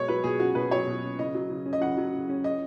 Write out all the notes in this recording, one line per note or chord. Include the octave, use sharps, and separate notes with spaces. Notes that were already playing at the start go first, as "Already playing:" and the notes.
Already playing: B2 G#3 C#5
F#3 B4
B2 G#4
C#4 F#4
B2 B4
F#3 C#5
B2
C#4
C#3 D#5
F#3
C#3
C#4
D#5
C#3 F#5
F#3
C#3
C#4
D#5